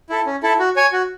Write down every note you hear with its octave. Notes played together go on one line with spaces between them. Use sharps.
E4 A4
C#4
E4 A4
F#4
C#5 G#5
F#4